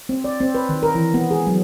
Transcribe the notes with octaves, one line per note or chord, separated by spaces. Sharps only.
C4
D5
C4
B4
D#3
A#4
E3
B3
G#4
F#3